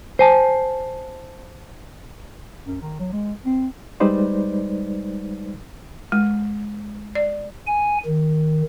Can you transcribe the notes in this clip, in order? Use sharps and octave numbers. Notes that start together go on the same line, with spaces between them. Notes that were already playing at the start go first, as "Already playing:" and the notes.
C5 G#5 A5
F#2
D#3
F#3
G#3
C4
G3 G#3 D#4 B4 C5 D5
G#3
D5
G#5
D#3